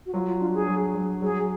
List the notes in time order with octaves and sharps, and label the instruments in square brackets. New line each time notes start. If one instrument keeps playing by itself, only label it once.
[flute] F#4
[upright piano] F#3 [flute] F4
[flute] F4
[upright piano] D4 [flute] F4
[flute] G#4
[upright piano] F#3
F#3
[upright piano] F#3 [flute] G#4